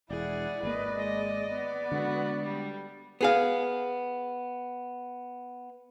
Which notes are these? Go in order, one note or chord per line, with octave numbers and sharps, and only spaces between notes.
E1 E4 G#4 D5 F#5
G#1 A#3 B4 D#5
G#3 D#5
B3
D3 G#3 F#4
G3
B3 G#4 F5